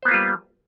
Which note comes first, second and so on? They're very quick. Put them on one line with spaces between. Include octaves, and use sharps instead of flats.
C5 B3 A#3 F4 G3